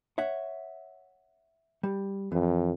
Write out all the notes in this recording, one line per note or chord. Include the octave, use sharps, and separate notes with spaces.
C#5 E5 F#5
G3
F2 E3